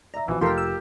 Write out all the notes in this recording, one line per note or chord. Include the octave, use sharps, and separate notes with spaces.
D5 E5 A#5
A#1 E3 F3 B3 F#4
F1 F4 G4 A4 A#4 G5 C6
E6